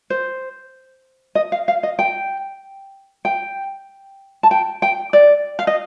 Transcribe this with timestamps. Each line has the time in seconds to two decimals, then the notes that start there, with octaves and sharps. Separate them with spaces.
0.10 C5
1.35 D#5
1.52 F5
1.68 F5
1.83 D#5
1.99 G5
3.25 G5
4.43 A5
4.51 G5
4.82 G5
5.13 D5
5.59 F5
5.67 D#5